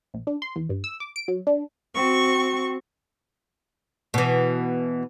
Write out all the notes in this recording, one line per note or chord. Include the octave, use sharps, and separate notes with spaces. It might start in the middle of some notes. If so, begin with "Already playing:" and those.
A#1
D4
C6
E2
G2
E6
D6
D7
F#3
D4
C4 F#4 C#6
B2 E3